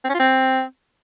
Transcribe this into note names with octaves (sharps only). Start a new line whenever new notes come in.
C4
C#4
F4
C4